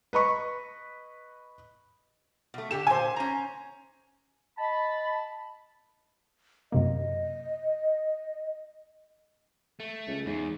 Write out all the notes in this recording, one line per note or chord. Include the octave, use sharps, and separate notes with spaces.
B4 D#5 B5 C#6
B2 A3
D3 G4 A4 E7
A#2 C#3 C5 G#5
C#4 A#5
D#5 A5 B5
F#2 C3 A#3 D#5
A3
C#2
E2 G#2